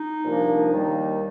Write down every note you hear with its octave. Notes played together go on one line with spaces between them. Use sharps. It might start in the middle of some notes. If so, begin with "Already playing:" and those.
Already playing: D#4
C2 A#2 F3 A#3 D4
D#2 D#3 G3 A#3